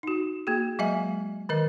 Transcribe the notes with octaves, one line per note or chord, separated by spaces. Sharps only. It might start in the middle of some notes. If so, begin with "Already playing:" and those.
D#4 F#4
A#3 F#4 G#4
F#3 G#3 D#5 E5 G#5
D#3 A#4 D#5